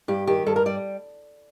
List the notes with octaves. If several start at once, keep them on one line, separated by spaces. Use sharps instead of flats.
G2 G4
D#3 G4
G2 A4
A#4
G3 D5